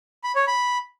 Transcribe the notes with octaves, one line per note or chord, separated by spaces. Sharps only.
B5
C#5
B5